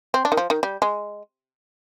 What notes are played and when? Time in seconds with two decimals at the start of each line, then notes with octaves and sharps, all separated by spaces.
0.14 C4
0.25 D4
0.32 D#3
0.37 F3
0.50 D#3
0.63 G3
0.82 G#3